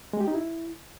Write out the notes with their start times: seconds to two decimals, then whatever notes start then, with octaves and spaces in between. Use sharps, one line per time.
0.13 G#3
0.21 G4
0.28 D#4
0.35 E4